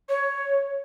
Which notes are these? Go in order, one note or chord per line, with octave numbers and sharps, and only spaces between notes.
C#5